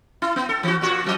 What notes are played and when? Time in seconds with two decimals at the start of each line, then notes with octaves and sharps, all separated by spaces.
0.22 E4
0.36 B3
0.49 A4
0.63 E3 F#4
0.81 A#2 F4 F#4
1.04 F2 F#3 D#5